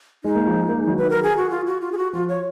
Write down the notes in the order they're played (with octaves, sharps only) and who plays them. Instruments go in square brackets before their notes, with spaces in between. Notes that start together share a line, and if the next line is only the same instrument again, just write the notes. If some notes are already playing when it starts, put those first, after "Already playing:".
[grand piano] G#3 [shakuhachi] D#4
[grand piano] A#3
F3 G#3
A#3
G#3
D#3 F#3
[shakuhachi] B4
A#4
G#4
F#4
F4
F#4
F4
G#4
F#4
[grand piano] F3 [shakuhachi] F4
[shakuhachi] C#5